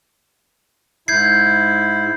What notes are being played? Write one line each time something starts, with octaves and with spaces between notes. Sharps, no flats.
G#2 E4 G6 G#6 C7